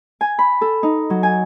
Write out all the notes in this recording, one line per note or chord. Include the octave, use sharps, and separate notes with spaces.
G#5
B5
A4
D#4
F#3
G#5